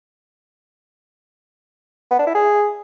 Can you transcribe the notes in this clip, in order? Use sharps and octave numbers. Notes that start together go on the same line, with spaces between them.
B3
D4
E4
G#4